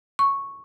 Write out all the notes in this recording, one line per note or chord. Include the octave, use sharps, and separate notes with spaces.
C#6